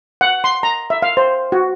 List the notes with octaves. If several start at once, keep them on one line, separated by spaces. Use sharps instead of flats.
F#5
C6
A#5
E5
F5
C5
F#4